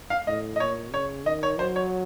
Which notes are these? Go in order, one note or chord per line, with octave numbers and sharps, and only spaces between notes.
F5
A2 D#5
D#5
A#2 C#5
C#3 C#5
D#3 D#5
C#5
F#3 C5
C#5